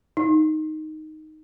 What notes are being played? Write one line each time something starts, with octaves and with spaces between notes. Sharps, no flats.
D#4